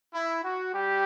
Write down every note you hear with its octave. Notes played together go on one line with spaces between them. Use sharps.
E4
F#4
G3 G4